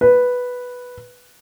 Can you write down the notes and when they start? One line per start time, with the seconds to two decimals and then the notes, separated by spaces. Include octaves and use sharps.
0.01 B4